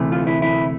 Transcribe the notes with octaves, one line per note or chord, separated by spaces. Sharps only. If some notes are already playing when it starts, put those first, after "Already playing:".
Already playing: D2 C3 E3 A3
F4
E4
E4